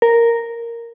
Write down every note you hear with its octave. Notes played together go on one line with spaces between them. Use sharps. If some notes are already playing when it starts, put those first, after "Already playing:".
A#4